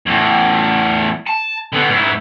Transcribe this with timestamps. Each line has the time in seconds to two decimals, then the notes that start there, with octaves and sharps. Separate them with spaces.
0.06 E2 A2
1.27 A5
1.73 D3 B3
1.89 G#2 E4